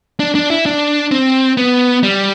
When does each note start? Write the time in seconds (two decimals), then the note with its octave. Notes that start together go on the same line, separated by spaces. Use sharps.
0.20 D4
0.35 D4
0.50 E4
0.66 D4
1.11 C4
1.57 B3
2.03 G3